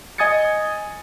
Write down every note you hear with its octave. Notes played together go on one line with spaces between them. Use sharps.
D#5 G#5 D#6 G#6 A6 C#7